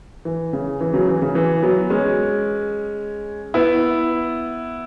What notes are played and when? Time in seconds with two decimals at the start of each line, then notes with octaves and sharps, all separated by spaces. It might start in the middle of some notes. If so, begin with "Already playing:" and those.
0.25 E3
0.53 C#3
0.81 E3
0.93 C#3 F#3
1.07 E3
1.22 C#3
1.35 E3
1.63 F#3 B3
1.90 G#3 C#4
3.54 B3 E4